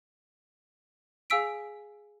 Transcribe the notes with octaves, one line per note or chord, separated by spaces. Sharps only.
G#4 F5 G#5 E6 B6 D7